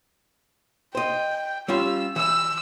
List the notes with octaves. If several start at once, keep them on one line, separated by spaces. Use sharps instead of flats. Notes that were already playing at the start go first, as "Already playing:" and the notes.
C5 D#5 G5
G3 C#4 F4 E6
E3 E6